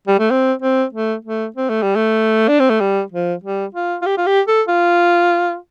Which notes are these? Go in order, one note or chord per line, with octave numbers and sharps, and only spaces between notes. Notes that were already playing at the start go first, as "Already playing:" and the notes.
G3
A3
C4
C4
A3
A3
C4
A3
G3
A3
D4
C4
A3
G3
F3
G3
F4
F4
G4
F4
G4
A4
F4